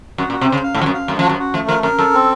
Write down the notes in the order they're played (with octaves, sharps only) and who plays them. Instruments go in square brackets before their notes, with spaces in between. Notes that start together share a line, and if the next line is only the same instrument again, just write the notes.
[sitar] F#2 [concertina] F#4
[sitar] A#2
[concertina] F#4
[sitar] C3
[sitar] C#3 [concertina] C5
[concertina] F5
[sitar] A2
[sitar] F3 [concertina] F#4
[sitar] F#2
[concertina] F5
[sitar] F#2 [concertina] A3
[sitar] F3 [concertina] F#4
[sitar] F#2
[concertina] F#4
[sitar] F3 [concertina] A3
[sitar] F3 [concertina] A#4
[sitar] F#2 [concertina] A#4
[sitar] F#2 [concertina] A4
[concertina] C4